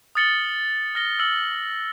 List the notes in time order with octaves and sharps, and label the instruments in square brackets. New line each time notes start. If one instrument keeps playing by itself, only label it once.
[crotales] D#6 F6 A6 C#7 F#7 G7
F6 A#6 G7
E6 F6 C#7 F#7